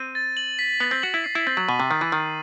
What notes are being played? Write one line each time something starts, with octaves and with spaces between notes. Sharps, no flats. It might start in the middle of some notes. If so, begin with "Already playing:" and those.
Already playing: C4 D#7
A6
F#7
B6
B3 F#7
C4
F#4 F#7
E4
C7
E4
C4 A6
F#3
B2 D#7
C3
D#3 E6
E3
D#3 B6